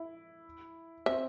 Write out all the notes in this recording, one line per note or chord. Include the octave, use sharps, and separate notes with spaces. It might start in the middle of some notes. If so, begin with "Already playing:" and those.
Already playing: E4
C4 E5